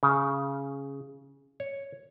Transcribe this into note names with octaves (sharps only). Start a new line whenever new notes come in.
C#3
C#5